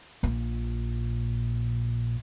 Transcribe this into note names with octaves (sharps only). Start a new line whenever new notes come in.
A#1 A#2